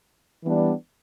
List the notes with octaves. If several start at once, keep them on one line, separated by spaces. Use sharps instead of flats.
E3 G3 B3 D4